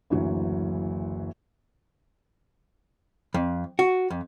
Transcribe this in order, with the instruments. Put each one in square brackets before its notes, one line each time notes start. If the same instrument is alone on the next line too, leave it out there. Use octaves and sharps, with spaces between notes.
[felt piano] F#1 D2 E3 F#3
[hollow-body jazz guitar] F2
F#4
F2